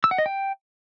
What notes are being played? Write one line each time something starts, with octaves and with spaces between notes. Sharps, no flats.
E6
F#5
D#5
G5